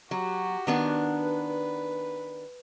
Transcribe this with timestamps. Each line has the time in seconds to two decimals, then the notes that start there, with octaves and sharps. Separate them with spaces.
0.11 F#3 F#4 G4
0.67 D#3 B3 D4
1.17 B4